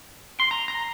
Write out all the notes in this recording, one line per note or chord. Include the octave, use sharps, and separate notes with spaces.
C6
A#5
A#5